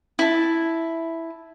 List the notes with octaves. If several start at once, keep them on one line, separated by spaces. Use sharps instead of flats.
E4 A5